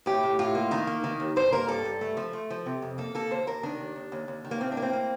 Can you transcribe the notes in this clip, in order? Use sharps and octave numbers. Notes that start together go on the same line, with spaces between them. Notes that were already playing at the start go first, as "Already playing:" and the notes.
A2 G4
A2
A2 F4
A#3
D#3 D#4
A#3
D#3
D#2
G2 C5
A#3 A#4
G2 A4
G2
A3
F3
A3
F3
C3
F2
A#3 A4
A#3 A4
D#2 C5
D#2 A#4
D#3 D4
D#2
D#2
D#2
D#2
D#3
A#3
A2 C4
D4
A#3
C4
A#3